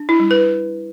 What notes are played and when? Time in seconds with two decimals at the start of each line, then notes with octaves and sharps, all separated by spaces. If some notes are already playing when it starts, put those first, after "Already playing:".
Already playing: D4
0.09 E4
0.20 G3
0.31 B4